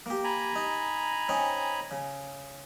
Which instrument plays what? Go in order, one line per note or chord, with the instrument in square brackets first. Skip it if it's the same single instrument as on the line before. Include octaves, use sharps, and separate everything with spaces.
[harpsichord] A#3 G4
[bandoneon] G#5 A#5 B5
[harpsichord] D#4
C4 C#4 D#4
C#3